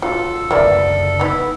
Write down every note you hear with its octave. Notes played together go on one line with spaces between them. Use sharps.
F#3 F4 A4
F#1 D2 A#3 B3 D5 E5
B3 D#4 E4